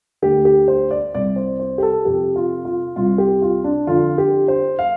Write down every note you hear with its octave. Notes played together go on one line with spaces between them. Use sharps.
D2 D3 G4
G4
C5
D5
C2 C3 D5
C5
C5
G4
A4
F2 C3 G4
F4
F4
C2 C3 F4
G4
F4
D4
F2 D3 F4
G4
C5
F5